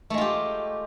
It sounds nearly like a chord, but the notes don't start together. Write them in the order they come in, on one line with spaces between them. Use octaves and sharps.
A3 G#3 F4 G4